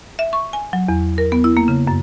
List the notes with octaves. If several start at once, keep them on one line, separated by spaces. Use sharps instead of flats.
E5
C#6
G#5
F#3
E2
A#4
B3
E4
A#3
C#3
F#2